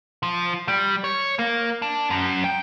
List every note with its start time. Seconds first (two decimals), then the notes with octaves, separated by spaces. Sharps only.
0.23 F3
0.68 G3
1.04 C#5
1.39 A#3
1.82 D4
2.10 F#2
2.44 G5